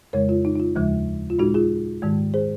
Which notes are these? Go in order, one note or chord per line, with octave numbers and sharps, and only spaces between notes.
F2 C#3 G#3 A#4 C#5
F4
D#4
D#4
F4
D#2 C#3 F3 G#3
F4
A#2 G#3 D#4 F#4
F4 G#4
G#2 D#3 G#3
G#4 C5